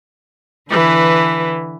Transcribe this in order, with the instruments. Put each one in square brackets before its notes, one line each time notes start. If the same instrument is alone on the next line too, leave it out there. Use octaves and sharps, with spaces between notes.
[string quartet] D3 E3 B4